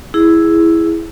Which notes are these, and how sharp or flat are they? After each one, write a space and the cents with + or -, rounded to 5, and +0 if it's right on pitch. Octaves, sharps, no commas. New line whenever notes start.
E4 +0 G#4 +0